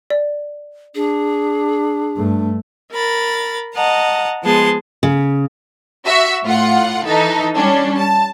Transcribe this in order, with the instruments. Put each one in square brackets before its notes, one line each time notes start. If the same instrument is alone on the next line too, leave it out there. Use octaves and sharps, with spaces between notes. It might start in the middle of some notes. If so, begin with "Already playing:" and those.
[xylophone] D5
[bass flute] D4 [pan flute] G#4
[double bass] G2 A3
[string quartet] A#4 B5 A6
D#5 F#5 A5 A#5
F3 G#3 B3 G#4 A5 C6
[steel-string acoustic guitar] C#3
[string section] F#4 E5
A2 F4 F#5
E3 D#4 A4
G3 C#4 D4
A5